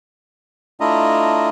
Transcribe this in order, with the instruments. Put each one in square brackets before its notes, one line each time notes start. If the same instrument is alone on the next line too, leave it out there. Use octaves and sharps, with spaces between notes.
[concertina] A3 D4 E4 F4 D#5 A#5